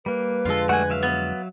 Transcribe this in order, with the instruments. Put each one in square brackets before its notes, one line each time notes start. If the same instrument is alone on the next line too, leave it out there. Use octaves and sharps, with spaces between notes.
[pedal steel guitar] G3 A#3 [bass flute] B4
[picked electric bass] F2 D3 G#3 [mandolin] F4 A4
[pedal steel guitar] G3 A3 F#4 [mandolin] F#5 G#5
[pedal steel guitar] F#3 E5 F5
[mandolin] B3